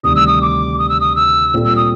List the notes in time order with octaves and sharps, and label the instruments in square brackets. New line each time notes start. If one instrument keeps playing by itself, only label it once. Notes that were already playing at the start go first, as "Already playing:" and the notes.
[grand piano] D2 C3 D#3 G3 [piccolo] D#6
[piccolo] E6
D#6
D6
D#6
E6
D#6
E6
[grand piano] A#2 G3 C4 F4 A4
[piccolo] E6
D#6